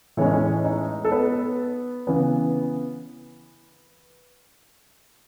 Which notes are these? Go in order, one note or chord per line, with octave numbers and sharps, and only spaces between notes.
A2 E3 G#3 C#4 C#5
D#5
C#4 C#5
D#4 D#5
A4
B3 B4
C#3 E3 B3